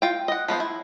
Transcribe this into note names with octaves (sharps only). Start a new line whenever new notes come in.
F4 G5
D#5 F#5
F3 B3 A4 C5
E4